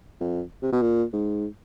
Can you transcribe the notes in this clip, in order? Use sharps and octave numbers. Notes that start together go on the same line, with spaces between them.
F2
C3
B2
A#2
G#2